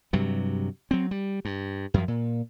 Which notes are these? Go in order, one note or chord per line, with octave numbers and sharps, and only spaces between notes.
G2 C3 F#3
F#3 C4
G3
G2
F#2 F3
A#2